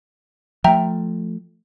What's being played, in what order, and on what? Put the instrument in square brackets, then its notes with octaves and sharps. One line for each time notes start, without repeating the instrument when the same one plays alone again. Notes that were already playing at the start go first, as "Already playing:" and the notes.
[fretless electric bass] F3 A3 [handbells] E5 G5 A#5